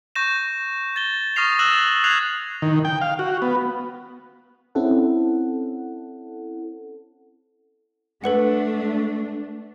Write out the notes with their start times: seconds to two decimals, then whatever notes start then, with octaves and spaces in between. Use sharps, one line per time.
0.15 C#6 G6 A#6 E7
0.96 A6 G7
1.36 C#6 D#6 F6 A#6 C7 F7
1.59 E6 F#6 A6 A#6 E7 F#7
2.04 F#6 G#6 C7 F7 F#7
2.62 D#3
2.85 G5
3.02 F5
3.19 F#4
3.42 B3
4.75 C4 C#4 E4 A4 F#5
8.24 A3 D4 A4 B4 F#5